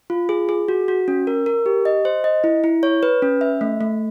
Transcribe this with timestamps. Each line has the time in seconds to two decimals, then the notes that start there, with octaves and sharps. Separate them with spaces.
0.10 F4
0.29 G#4
0.49 G#4
0.68 F#4
0.88 F#4
1.08 C#4
1.27 A#4
1.46 A#4
1.66 G4
1.85 D#5
2.05 C5
2.24 D#5
2.44 E4
2.64 E4
2.83 C#5
3.03 B4
3.22 C#4
3.41 E5
3.61 A3
3.81 A3